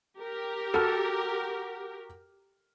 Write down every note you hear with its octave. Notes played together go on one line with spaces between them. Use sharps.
G4 A#4
F#4 A4 F6